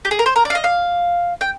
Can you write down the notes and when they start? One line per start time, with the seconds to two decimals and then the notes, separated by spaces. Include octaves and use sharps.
0.05 G4
0.11 G#4
0.19 A#4
0.26 C5
0.36 A#4
0.45 D5
0.50 F5
0.55 D#5
0.64 F5
1.41 G5